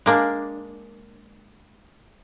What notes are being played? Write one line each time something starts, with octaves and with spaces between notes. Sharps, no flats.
G#3 A#3 D4